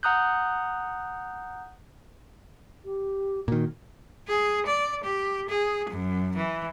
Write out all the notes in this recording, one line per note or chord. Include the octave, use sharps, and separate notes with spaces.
F#5 A#5 D#6 F#6 G6
G4
A#2 D#3 F#4
G#4
D5
G4
G#4
F#2
E3